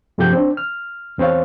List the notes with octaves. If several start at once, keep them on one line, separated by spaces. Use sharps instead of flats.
G2 C3 F3 A3 G4 G6
C4 D4
F6
E2 C4 C5 C#5 F5